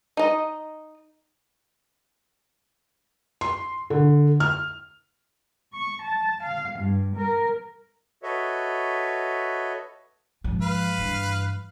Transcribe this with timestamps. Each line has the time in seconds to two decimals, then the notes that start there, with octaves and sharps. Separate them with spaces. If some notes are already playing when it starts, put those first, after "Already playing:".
0.17 D#4 D#5
3.41 C6
3.90 D3
4.40 F6
5.73 C#6
6.01 A5
6.42 F5
6.78 G2
7.15 A#4
8.23 F#4 A4 B4 C#5 D#5 E5
10.44 G#2 F3
10.62 B4 F5
10.98 G2 E3